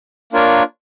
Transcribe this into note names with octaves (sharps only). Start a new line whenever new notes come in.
A#3 D4 F4 A#4 C#5